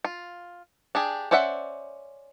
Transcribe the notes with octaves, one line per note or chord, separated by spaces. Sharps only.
F4
D4 G4 G#4
C#4 C5 D5 E5 F#5